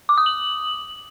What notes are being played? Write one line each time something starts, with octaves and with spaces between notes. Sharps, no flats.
D6
D#6
F#7